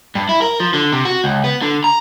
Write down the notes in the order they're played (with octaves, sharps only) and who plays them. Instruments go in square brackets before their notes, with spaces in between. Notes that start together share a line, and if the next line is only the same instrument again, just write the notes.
[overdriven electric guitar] G2
E4
A#4
F3
D3
C3
F#4
C#2
B3
D3
A#5